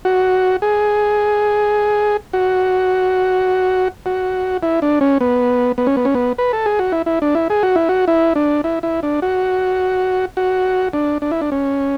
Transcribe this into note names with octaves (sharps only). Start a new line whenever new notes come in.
F#4
G#4
F#4
F#4
E4
D4
C#4
B3
B3
C#4
B3
C#4
B3
B4
A4
G#4
F#4
E4
E4
D4
E4
G#4
F#4
E4
F#4
E4
D4
E4
E4
D4
F#4
F#4
D4
D4
E4
D4
C#4